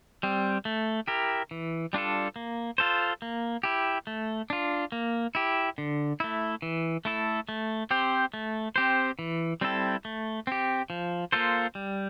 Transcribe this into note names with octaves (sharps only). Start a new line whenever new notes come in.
G3 C4
A3
E4 G4 A#4
E3
G3 D4 F4 A4
A#3
F4 A4 C5
A#3
E4 G4
A3
D4 F4
A#3
E4 G4
D3
A3 E4
E3
A3 E4 A4
A3
C4 G4 C5
A3
C4 G4 C5
E3
G3 C4 E4 A4
A3
C4 G4
F3
A#3 F4 A4 C5
G3